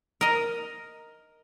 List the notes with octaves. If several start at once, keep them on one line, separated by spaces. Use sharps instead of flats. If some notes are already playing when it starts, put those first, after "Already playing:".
A#4 D#5